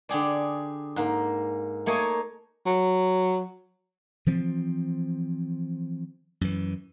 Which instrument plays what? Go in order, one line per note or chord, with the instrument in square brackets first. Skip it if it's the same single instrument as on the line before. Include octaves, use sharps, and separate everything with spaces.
[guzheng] D3 G4 G#4 D5
G#2 A#3
A3 A#3 C#5 D#5 G#5
[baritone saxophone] F#3
[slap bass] E3 F3 C4
F#2 E3